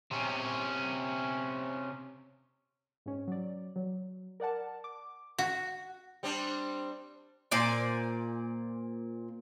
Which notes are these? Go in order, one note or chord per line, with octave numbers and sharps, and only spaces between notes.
C3 C#4
G#2 C#4
F#3 D5
F#3
A#4 D5 F#5 A5
D6
F#4
G3 C4 D4
A#2 C5 D5 G#5